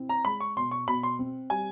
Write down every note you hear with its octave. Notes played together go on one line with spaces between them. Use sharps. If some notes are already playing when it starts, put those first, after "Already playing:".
Already playing: C4 E4
A#5
G#3 B5
C#6
B2 C6
C#6
B2 B5
C6
C4
G3 G#5